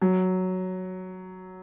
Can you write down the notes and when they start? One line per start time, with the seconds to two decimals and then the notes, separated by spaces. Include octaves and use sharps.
0.02 F#3